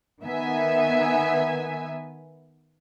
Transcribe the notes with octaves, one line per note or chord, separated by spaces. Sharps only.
D#3 B3 E5 G#5